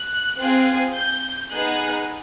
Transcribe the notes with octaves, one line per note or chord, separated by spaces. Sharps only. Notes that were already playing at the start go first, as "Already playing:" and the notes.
Already playing: F#6
C4 F4 G#4
G6
B3 D#4 G#4 F#6